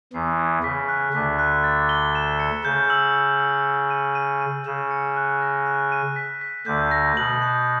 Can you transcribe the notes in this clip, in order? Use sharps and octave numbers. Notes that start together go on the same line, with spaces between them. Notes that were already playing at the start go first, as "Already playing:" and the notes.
E2 E3 C7
G#6
C#3 B6
F#6
D2 D3 B6
F#6
A6
G7
E7
C#7
C#3 G6
E6
G6
E6
G6
D#7
D#7
D#7
C#3 E7
C#7
F#6
A#6
F#6
D#7
B6
B6
D2 D3 G6
A#6
B2 F#7
G6